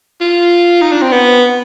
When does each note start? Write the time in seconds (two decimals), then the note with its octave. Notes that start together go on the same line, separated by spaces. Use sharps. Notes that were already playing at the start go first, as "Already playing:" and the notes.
0.21 F4
0.81 D#4
0.92 D4
1.02 C4
1.12 B3